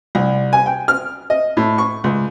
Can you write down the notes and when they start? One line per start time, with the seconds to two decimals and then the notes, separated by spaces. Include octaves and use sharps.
0.15 C2
0.53 G#5
0.66 G5
0.88 F6
1.30 D#5
1.57 A2
1.78 C#6
2.04 C#2